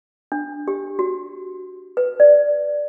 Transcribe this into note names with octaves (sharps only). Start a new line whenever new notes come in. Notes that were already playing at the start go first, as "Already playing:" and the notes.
D4
G4
F#4
B4
D5